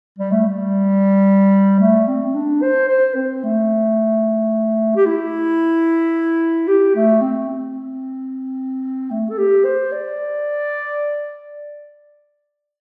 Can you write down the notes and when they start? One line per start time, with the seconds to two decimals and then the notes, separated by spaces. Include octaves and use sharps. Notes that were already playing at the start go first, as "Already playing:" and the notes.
0.18 G3
0.31 A3
0.46 G3
1.80 A3
2.07 C4
2.25 C4
2.34 D4
2.62 C5
2.88 C5
3.15 C4
3.43 A3
4.96 G4
5.05 E4
6.67 G4
6.95 A3
7.21 C4
7.49 C4
9.10 A3
9.30 A4
9.38 G4
9.64 C5
9.92 D5